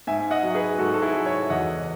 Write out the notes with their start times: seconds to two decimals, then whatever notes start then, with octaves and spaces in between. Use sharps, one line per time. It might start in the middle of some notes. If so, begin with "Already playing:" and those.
0.07 G#2 E5 G#5
0.31 D#5 F#5
0.43 F#3
0.55 G#4 B4
0.78 G#2 F#4 A4
0.94 A4
1.02 E4 G#4
1.14 F#3
1.26 C#5 E5
1.50 E2 D#5 F#5